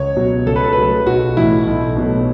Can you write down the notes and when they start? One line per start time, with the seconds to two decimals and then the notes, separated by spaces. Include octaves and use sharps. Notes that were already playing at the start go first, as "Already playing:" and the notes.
Already playing: C#2 C#5
0.17 B2 F#3
0.46 C#2 A4
0.56 B4
0.64 A4
0.73 B4
0.77 C#3 F#3 A3 A4
1.06 B1 F#4
1.37 A2 E3 A3 E4
1.67 B1
1.97 B2 F#3 A3